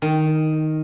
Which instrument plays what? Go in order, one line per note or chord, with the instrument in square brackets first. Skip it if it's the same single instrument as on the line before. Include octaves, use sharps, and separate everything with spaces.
[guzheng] D#3